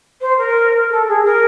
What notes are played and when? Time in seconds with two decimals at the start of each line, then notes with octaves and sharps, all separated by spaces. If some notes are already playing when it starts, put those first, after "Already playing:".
0.21 C5
0.37 A#4
0.89 A4
1.08 G#4
1.24 A#4